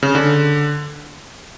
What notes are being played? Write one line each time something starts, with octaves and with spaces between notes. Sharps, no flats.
C#3
D3